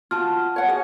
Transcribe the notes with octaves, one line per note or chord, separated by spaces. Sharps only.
F4 F#4 A5 F6
C#5 F#5
F#4 G#4